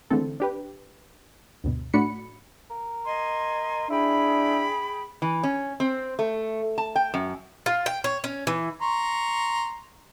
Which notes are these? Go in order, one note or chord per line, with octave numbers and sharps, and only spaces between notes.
D3 E3 G#3 A3 C4 A4
D4 G4 B4
D2 G2 B2
A2 A3 D4 F#4 B5 C#7
A#4
D#5 G#5 C6
D4 E4 G#4 G5 B5
E3
C#4
C4
A3
A5
G5
F#2
F4
G5
C#5
C#4
E3
A#5 C6 C#6